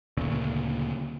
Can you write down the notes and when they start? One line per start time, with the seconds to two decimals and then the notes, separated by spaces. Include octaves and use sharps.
0.17 D2 A#2 C#3